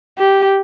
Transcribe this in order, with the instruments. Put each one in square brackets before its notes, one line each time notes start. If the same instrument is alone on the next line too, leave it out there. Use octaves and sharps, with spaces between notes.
[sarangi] G4